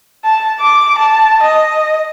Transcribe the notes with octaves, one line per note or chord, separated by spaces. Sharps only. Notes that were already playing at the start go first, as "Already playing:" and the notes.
A5
D6
A5
D#5